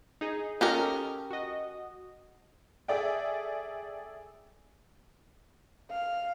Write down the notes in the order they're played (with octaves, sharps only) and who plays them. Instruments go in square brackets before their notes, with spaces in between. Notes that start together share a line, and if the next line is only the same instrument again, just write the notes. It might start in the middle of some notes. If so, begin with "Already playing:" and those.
[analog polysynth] D#4 G#4
[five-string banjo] C#4 G4 A#4 [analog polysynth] A4 D#5
[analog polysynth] F#4 D#5
[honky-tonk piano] G#4 A4 D5 E5 G5
[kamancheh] F5